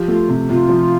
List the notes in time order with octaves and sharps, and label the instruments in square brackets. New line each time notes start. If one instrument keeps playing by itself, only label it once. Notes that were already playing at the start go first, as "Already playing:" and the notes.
Already playing: [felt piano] F3 G4
[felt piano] A3 [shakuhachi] F4
[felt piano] C3
[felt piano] C3 [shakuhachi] F4
[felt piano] F3